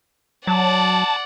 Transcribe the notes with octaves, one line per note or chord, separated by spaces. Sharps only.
F#3 D5 F#5 A5